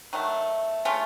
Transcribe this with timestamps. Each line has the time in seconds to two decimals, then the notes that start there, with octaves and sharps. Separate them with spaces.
0.13 D#3 F#3 A3
0.85 C#3 A3 C#4 F4